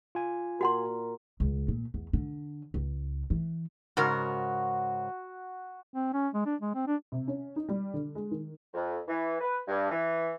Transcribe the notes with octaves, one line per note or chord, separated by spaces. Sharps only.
F4 G#5
A#2 F#4 A#4 F#5 C6
C#2
A#2
E2
D3
C#2
E3
G#2 C#3 F#4 A#4
C4
C#4
G#3
D4
G#3
C4
D4
C3
C#4
D#4
G3
D3
G#3
D#3
F2
E3
B4
G2
E3